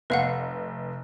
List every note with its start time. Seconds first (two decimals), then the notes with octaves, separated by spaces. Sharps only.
0.10 F1 B4 F5 F#5